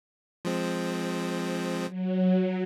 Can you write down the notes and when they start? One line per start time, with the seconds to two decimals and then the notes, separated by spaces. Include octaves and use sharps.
0.45 F3 G#3 C4
1.87 F#3